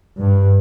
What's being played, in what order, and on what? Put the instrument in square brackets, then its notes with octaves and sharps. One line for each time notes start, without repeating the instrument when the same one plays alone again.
[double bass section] G2